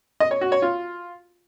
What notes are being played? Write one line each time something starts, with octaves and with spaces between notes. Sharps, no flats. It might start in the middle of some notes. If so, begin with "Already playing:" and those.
D#5
C#5
F#4
C#5
F4